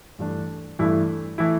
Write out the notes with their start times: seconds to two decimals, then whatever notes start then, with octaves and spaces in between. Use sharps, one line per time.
0.19 G2 E3 A3 D4
0.79 G2 E3 A3 E4
1.38 E3 A3 E4